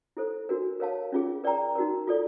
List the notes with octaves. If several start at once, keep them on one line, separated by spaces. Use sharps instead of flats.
E4 A4 C5
D4 F#4 A#4
A#4 C#5 F5 A5
C#4 F4 G#4
A#4 D5 G5 A#5
D#4 F#4 A#4
F4 A4 D5